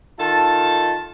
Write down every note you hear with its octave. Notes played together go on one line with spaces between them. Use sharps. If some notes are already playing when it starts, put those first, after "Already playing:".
D#3 F4 A4 A5